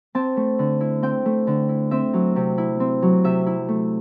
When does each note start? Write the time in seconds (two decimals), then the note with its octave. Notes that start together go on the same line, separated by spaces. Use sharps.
0.15 C4 A5
0.37 A3
0.59 D3
0.81 E4
1.03 C4 G5
1.26 A3
1.47 D3
1.69 E4
1.91 C4 E5
2.13 F#3
2.36 C3
2.58 E4
2.80 C4
3.02 F#3
3.24 C3 E5
3.46 E4
3.69 A3